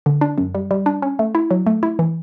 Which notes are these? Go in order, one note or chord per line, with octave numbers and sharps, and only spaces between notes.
D3
D4
F#2
G3
G3
D4
C#4
A3
E4
F#3
A3
E4
E3